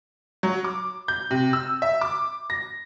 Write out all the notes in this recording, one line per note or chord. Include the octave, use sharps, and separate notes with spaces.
F#3
D6
G6
C3
E6
E5
D6
A#6